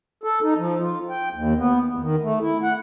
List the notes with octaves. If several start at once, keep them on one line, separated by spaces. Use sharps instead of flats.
A4
D#4
F3
F4
G5
D#2
B3
E2
D#3
A3
E4
F#5